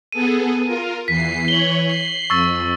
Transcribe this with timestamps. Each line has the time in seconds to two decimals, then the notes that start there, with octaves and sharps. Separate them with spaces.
0.12 B3 G#4 A4 D#7
0.65 F4 A#4
1.08 E2 E3 B6 C7
1.48 E3 C#5 F#7 G7
1.87 C7
2.30 F2 C#6 E6 A6